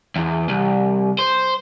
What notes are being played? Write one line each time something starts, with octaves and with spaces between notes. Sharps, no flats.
E2
C2
C5